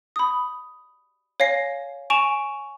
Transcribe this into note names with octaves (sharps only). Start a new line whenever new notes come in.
B5 D#6
C#5 F5 G#5 A#6 C7
G#5 C#6 D7 E7 F7